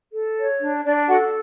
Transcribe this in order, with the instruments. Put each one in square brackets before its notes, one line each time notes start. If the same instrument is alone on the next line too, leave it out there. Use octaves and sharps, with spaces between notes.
[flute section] A4
C#5
D4
D4 D5
F#4 A4 F#5